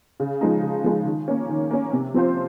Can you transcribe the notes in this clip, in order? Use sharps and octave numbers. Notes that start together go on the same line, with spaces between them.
C#3
F3 G#3 D#4
C#3
F3 G#3 D#4
D#3
A#3 C#4
D#3
A#3 C#4
C3
F3 C4 F4 C5